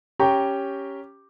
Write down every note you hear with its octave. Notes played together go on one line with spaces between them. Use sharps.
C#4 G4 G5 A#5 C#6